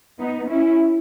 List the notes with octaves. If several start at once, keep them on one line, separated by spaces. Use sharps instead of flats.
B3 D#4
C#4 E4